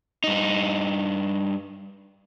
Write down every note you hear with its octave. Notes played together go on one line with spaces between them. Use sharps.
G2 D#4